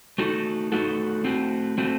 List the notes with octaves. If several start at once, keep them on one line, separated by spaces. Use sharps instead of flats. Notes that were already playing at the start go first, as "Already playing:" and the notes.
A3 D#4 F#4 A4
A3 D#4 F#4 A4
A3 C4 F#4
A3 C4 F#4